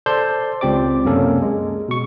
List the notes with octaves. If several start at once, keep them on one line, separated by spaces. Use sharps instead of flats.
A4 C5 D5 A5 C6 G6
C#2 C4 G4 D5 D6
F#2 C3 A#3 C#4 A4 A#4
G#3
B2 C#6